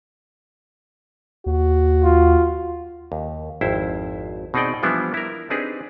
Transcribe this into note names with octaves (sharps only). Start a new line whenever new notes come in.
D#2 F#4
F4
D#2
G#1 F2 E4 C5
B2 C4 D#4 G#4 D5 G5
E3 F3 G3 B3 D4 E4
E4 A#4
C4 D4 D#4 G4 G#4 B4